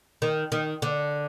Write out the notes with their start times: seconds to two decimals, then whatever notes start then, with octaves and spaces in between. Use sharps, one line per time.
0.22 D#3
0.52 D#3
0.82 D3